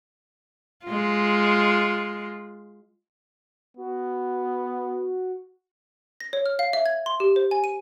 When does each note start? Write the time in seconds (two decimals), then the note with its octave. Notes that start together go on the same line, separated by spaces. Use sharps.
0.85 G#3 F4
3.77 B3 F#4
6.20 A#6
6.33 C#5
6.46 F6
6.59 F5
6.73 E5
6.86 G#6
7.06 C6
7.20 G4
7.36 C5
7.51 G#5
7.64 D#7